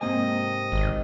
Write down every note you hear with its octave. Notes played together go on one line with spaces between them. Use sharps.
G#2 C3 A#3 C4 D#5 G#5
G#1